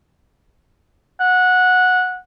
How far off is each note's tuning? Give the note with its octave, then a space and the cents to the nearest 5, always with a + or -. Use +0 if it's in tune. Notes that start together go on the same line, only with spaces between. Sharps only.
F#5 -15